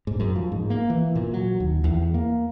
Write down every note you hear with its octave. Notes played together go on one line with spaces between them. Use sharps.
G#2
F#2
F3
G#2
A#3
E3
A#2
F#3
D#2
E2
A#3